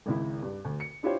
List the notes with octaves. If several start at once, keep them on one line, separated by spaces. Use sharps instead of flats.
G#1 C#2 E4
G2
D2
C#7
D4 E4 F4 G4 C5 C#5